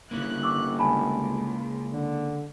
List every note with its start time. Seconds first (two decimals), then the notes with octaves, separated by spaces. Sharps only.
0.11 G1 A#3 C#4 E4 F#6
0.43 C#6 D6 E6
0.79 C#2 G#5 A5 B5
1.92 D3